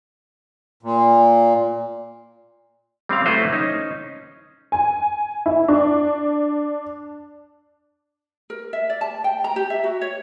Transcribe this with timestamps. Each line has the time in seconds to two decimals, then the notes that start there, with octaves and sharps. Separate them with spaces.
0.83 A#2
3.09 G3 C4 C#4 F5
3.26 F#3 A3 E4 F#4 B4 C5
3.52 C#4 D#4
4.72 G#5
5.46 E4
5.68 D4
8.50 A#4
8.73 E5
8.90 D5
9.01 A5
9.24 G5
9.44 A#5
9.56 G4
9.70 E5
9.84 F#4
10.01 C#5